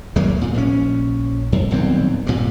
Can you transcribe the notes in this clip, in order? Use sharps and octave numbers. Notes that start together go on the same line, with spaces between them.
D#2 F#3 G#3 A#3
A#2
A#1 G3 C#4
F2
D#1 B1 E2 C4
G2 A#2